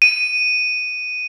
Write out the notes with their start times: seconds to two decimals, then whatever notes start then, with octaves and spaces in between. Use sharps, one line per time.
0.02 D#7